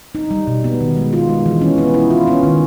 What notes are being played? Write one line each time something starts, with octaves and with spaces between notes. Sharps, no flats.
D#4
G3
B2
B3
D#3
G#3
F4
G#3
E3
C#4
B3
E4
F4
C#4
D#3